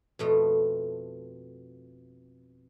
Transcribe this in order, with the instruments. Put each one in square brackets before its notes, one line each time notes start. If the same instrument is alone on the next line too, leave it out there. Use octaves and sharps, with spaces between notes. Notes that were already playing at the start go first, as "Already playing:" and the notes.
[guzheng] F2 B2 A3